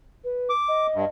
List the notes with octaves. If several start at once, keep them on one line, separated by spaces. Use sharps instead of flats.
B4
D6
D#5
G2